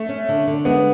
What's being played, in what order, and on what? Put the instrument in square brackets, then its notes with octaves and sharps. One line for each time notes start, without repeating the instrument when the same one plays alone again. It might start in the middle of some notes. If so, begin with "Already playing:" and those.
Already playing: [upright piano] A3
[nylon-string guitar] C#4
D3
D3
[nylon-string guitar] G#3 [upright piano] B3